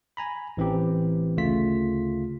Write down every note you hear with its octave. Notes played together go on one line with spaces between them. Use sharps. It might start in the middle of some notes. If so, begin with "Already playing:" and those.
G#5 A#5 B5
A1 E3 C4 G4
D2 C#3 A3 F4 B6